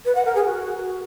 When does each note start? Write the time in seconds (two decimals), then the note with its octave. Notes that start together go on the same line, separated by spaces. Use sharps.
0.05 B4
0.15 F#5
0.25 A#4
0.35 G#4
0.45 F#4